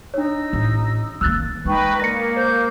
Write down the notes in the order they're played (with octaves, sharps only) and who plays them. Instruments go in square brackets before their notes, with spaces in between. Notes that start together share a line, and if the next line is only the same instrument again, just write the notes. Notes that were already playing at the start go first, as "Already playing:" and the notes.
[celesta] D4 C#5 [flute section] D#4 E6
[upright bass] A1
[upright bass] D#3 A#3 [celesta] E6 F#6 A6
[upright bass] G#3 [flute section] D#4 G5 C#6 [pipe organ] B4
[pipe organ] A#3 [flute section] A#4 D5 [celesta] A#6 C#7
[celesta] C5 [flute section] D6 G6